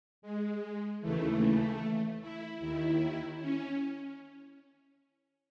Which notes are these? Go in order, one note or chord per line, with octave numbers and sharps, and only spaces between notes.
G#3
D#2 C#3 E3 A3
E4
D#2 D#3 E4
C#4